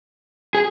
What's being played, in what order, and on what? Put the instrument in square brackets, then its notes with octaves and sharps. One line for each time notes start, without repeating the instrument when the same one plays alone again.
[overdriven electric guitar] G#4